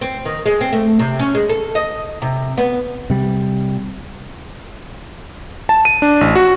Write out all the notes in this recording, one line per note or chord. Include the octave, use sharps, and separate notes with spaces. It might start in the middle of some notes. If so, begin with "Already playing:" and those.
C4
D#3
G#3
C4
A3
C3
C#4
G#3
A4
D#5
C3
B3
C3 G3
A5
D#7
D4
A1
F#4